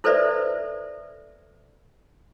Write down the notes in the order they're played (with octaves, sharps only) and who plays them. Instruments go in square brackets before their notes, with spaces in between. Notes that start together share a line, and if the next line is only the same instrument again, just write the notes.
[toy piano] E4 A4 B4 C5 D5 E5